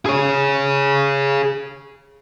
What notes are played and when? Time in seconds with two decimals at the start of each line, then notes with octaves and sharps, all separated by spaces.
0.06 G#4 C#5